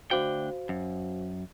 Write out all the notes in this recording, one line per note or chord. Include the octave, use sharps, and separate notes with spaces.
D2 D4 F#4 C5 F5 G5
F#2